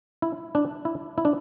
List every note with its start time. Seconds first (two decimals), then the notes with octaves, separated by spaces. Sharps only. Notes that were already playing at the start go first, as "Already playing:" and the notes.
0.22 E4
0.55 D4
0.85 E4
1.18 E4
1.25 D4